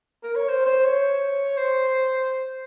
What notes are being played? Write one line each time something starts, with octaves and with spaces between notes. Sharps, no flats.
A#4
C#5
C5
C5
C#5
C5